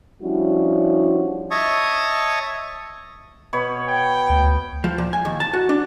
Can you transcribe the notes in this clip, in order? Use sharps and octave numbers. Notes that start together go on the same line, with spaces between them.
F3 G3 C#4 D4 E4 F#4
C#5 D#5 E5 A5 C#6 D#6
B2 C#5 B5
G5
D2
F3
A#2
G#5
D#2
A5
F#4
D4